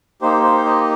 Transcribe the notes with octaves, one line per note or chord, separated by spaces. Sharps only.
A#3 D#4 G4 C5
C5
D#5